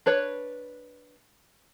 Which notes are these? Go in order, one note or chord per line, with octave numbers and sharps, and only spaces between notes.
D4 B4 C#5